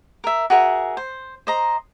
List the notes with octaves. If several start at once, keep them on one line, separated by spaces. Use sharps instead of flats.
A#4 E5
F#4 G#4 A#4 E5
C5
C5 D#5 A#5